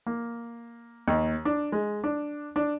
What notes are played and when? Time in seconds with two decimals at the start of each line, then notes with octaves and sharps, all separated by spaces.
0.06 A#3
1.08 D#2
1.45 D4
1.72 G#3
2.04 D4
2.56 D4